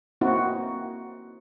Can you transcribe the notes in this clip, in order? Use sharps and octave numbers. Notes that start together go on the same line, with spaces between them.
A#3 C4 D#4 E4 F#4